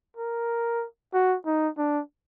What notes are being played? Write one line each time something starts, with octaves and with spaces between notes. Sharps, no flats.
A#4
F#4
D#4
D4